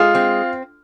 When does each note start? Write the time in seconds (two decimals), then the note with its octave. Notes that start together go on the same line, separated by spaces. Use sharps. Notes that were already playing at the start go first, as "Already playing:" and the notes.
Already playing: G#3 F4
0.15 C4